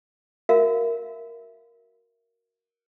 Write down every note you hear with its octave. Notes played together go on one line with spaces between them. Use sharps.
F#4 A#4 E5 F5